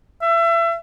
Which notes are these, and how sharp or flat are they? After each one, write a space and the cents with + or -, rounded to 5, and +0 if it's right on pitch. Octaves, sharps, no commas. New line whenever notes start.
E5 +30